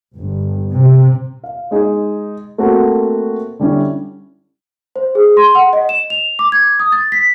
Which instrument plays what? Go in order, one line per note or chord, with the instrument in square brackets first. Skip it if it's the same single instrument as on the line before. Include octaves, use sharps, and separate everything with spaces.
[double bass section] G1
C3
[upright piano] F5
G#3 D#4 G#4
A3 A#3 C4 F#4
D3 G3 C#4 E4
[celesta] C5
G#4
C6
F#5
D#5
E7
F7
D6
G#6
D#6
A6
B6